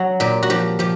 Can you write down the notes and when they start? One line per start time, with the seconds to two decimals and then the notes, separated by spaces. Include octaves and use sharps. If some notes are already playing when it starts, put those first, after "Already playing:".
Already playing: F#3 F#4
0.20 A#2 G4
0.43 F#4
0.50 F3 G4
0.79 F3 G4